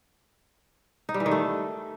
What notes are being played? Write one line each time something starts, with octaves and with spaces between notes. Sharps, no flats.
D#4
G3
E3
D#3
A3